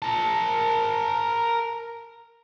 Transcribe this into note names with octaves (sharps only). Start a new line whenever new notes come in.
A#4 A5